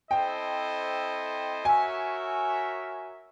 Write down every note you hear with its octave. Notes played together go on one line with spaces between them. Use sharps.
C4 E4 A4 C5 D#5 G5
F#4 A#4 C#5 E5 G#5